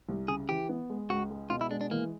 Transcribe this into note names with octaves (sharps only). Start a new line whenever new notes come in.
C2
C#3 G#4
E3 G4
B3
G#3
C#2 F#4
G#3
B2 F4
E4
G#3 D4
D4
E3 A#3